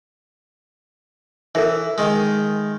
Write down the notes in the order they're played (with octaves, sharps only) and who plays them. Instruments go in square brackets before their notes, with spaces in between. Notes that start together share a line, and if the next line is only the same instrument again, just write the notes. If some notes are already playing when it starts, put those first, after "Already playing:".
[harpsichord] E3 [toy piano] A4 A#4 E5
[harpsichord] D#3 G#3